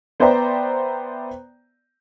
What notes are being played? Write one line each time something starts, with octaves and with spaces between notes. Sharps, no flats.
B3 C5 D5 E5 G5 A#5